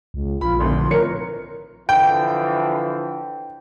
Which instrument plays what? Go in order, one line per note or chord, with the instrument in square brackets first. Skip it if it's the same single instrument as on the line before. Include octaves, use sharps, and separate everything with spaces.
[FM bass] C#2
[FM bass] A#1 [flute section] F4 [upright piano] B5
[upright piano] G#1 D2 D3 [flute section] C6
[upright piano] F3 C#5 C#7 [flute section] A#4 B4
[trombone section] D3 E3 F3 [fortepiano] G5